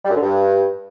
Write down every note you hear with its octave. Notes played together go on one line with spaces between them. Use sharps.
G3
F#2
D3
G2